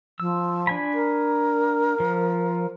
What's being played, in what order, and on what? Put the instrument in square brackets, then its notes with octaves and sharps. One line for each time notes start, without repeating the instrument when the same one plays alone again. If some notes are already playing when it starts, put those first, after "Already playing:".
[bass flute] F3 [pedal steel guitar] E6
[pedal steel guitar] D4 G#5 B5
[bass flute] A#4
[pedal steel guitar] F3